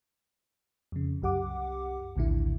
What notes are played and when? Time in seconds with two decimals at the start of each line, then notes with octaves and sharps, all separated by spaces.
0.92 F2 C#3
1.22 C2 F#2 G4 F#5 D6
2.16 A#1 D#2 A2 D3 E4